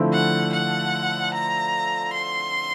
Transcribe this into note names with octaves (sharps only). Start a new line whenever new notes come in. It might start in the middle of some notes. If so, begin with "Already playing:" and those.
Already playing: D3 F3 A3 C4 E4
F#5
F#5
A#5
C6